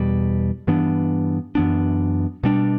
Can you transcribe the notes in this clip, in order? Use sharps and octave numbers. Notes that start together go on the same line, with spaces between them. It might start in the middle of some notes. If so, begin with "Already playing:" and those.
Already playing: E2 B2 G3
G2 E3 B3 D4
F#2 E3 B3 D4
B2 G3 D4